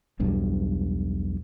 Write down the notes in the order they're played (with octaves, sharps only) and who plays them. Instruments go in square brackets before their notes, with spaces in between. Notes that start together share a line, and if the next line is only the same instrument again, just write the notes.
[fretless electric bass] E1 B1 G2